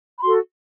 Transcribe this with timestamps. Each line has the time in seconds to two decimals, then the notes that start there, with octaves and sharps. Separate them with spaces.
0.18 B5
0.22 F#4 A4 C6